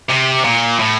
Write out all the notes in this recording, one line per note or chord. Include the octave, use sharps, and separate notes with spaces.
C3
A#2
A2